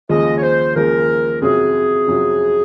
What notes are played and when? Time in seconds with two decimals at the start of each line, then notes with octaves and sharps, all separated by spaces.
0.09 D#2 C#3 F3 G#3 D#5
0.37 C#5
0.42 C5
0.75 D#2 C#3 F3 G#3 A#4
1.42 F2 C3 F#3 C#4 F#4 G#4
2.07 F2 C3 F#3 C#4 F#4